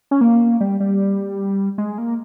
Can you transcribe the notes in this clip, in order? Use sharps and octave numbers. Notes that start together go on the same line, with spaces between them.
C#4
A#3
G3
G3
G#3
A#3